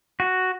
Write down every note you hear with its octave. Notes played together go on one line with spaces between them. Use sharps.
F#4